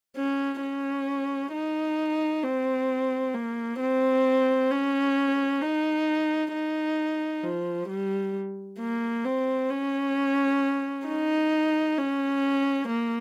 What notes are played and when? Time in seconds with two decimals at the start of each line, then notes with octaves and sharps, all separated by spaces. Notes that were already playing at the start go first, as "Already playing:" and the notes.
0.16 C#4
0.61 C#4
1.53 D#4
2.43 C4
3.35 A#3
3.80 C4
4.71 C#4
5.62 D#4
6.53 D#4
7.44 F3
7.89 G3
8.80 A#3
9.25 C4
9.71 C#4
11.07 D#4
11.98 C#4
12.88 A#3